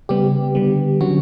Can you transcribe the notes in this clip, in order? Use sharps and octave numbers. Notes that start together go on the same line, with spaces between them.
C#3 G3 B3 G4
D3 G3 B3
D3 F#3 C#4 F#4